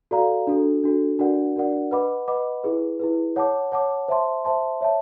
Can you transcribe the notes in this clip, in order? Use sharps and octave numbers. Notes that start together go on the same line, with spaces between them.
F#4 A4 D5 F5 A#5
D4 F#4 A4
D4 F#4 A4
D4 F#4 A#4 D5 F#5
D4 F#4 A#4 D5 F#5
B4 D#5 F#5 B5 D6
B4 D#5 F#5 B5 D6
E4 G#4 B4
E4 G#4 B4
C#5 F#5 A5 D6
C#5 F#5 A5 D6
C5 E5 A5 C6
C5 E5 A5 C6
C#5 E5 A5